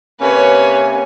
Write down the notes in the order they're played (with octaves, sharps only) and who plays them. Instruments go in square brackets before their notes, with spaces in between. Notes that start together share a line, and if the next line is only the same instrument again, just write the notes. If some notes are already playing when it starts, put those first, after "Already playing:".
[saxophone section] C3 A#3 C#4 [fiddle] B4 C#5 [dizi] G#5